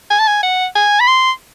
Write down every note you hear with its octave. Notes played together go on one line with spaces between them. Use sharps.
G#5
A5
G#5
F#5
G#5
B5
C6